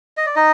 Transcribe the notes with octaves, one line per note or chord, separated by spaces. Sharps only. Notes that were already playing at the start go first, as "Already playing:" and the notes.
D#5
D5
D#4 D#5